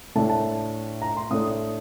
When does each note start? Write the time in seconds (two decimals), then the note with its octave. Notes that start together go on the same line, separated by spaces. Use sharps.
0.16 A2 A3 D4 A5
0.30 A5
1.02 A#5
1.17 C6
1.31 A2 A3 D4 D#6